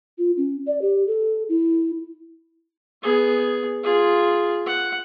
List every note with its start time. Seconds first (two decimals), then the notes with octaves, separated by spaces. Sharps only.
0.18 F4
0.37 C#4
0.67 D5
0.82 G4
1.07 A4
1.49 E4
3.02 B3 G#4
3.83 F4 G#4
4.66 F#5